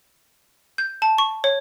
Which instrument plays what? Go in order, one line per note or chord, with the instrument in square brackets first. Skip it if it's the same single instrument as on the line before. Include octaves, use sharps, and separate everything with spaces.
[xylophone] G6
A5
C#6
C#5